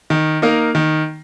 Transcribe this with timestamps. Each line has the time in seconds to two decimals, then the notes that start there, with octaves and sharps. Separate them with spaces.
0.10 D#3
0.42 A#3 D#4 A#4
0.75 D#3